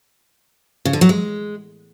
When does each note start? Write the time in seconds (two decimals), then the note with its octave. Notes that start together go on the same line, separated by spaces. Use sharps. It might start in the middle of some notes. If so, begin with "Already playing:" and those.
0.85 C#3
0.93 D3
1.01 F#3
1.09 G#3